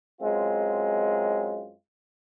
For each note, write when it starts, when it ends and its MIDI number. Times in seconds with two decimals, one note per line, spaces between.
0.20 1.71 42
0.20 1.71 56
0.20 1.71 60
0.20 1.71 65